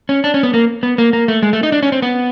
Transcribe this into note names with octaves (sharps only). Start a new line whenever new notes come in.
C#4
D4
C#4
B3
A#3
B3
A#3
A#3
A3
G#3
A3
D#4
D4
C#4
C4
B3